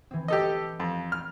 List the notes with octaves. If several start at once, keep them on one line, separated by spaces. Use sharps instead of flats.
E3 C4
G4 A4 D#5
F2 C4
F6